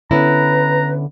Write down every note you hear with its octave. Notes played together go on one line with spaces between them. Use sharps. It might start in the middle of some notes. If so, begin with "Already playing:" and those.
D3 B3 C#4 E4 B4 A#5